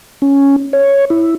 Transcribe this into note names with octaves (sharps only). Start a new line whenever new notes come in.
C#4
C#5
E4